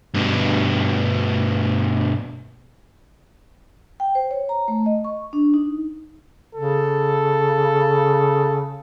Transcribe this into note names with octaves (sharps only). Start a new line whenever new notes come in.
G2 B2
G5
C5
C#5
A#5
A3
D#5
C#6
D4
D#4
C#3 A4